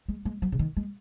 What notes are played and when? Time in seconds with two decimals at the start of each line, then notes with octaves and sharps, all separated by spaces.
0.08 G#3
0.25 G#3
0.42 F#3
0.52 C#3
0.59 D#3
0.77 G#3